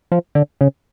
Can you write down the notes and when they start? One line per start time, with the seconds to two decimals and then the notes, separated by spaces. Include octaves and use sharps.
0.12 F3
0.35 D3
0.61 C#3